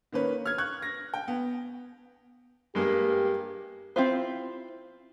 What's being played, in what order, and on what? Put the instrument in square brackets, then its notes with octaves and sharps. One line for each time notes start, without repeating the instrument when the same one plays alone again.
[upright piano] D#3 A#3 C#4 B4 C#5
F6 G#6
C#6 F#6 G#6
A#6
G5
B3
[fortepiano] G2 G#3 A#3 [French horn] G4
[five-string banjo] C4 E4 F4 C5